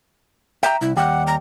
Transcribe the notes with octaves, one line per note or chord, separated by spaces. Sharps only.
E5 G5 A#5
C2 E4
D#2 G3 G4 F#5
A#5